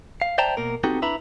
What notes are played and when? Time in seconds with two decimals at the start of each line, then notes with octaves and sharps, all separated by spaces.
0.22 F5
0.38 C5 D5 E5 G5 A5 A#5
0.57 B2 A#3 A#4
0.84 B3 C4 D#4 F#4 G4 A4
1.02 D4 E4 B4 E5 A#5 B5